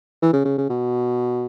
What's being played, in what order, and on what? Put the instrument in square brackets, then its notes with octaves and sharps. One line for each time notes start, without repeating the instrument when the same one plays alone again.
[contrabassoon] E3
C#3
C#3
C#3
B2